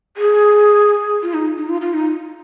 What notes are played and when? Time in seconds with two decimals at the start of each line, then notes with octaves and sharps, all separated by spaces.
0.17 G#4
1.22 F4
1.34 D#4
1.58 D#4
1.69 F4
1.81 F4
1.93 D#4